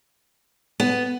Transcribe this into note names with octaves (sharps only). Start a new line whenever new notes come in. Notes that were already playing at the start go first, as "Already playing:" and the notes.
B3